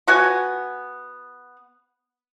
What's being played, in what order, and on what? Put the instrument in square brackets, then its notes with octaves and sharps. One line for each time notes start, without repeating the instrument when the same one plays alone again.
[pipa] B3 F#4 F#5 G#5